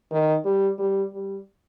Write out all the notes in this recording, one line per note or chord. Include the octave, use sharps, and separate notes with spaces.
D#3
G3
G3
G3